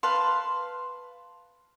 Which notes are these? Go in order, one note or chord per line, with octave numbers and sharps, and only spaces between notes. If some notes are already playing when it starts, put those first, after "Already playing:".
B4 F5 A5 C6